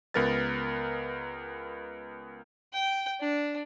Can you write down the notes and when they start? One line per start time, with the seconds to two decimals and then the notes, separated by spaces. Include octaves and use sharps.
0.14 C#2 B3 A#4 B4 A6
2.73 G5
3.21 D4